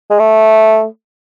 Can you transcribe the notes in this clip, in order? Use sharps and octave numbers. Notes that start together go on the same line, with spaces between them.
G#3
A3